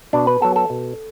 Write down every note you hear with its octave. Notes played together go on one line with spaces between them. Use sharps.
B2 D4
B4
F#3 B3 A4
A4
B2